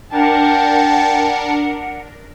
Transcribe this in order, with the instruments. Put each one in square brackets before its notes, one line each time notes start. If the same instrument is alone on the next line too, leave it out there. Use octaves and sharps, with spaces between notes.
[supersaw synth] D4 A#4 [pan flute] F#5 [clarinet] G5 [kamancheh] A5